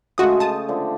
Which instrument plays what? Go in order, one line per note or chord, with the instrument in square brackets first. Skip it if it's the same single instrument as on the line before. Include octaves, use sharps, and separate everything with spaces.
[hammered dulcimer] C#3 G#3 A3 [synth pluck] F#4 D#6
[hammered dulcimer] C#5 G5 [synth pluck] A5 D#6
[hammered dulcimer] D3 F3 D4